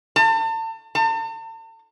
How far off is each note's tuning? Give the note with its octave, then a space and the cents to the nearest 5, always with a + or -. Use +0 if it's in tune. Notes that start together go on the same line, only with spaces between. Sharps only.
A5 +35
A5 +45